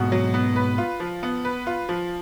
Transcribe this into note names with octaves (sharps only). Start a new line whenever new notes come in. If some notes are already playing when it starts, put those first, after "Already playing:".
Already playing: G#2 B2 F#4
F#3
B3
B4
F4
F3
B3
B4
F4
F3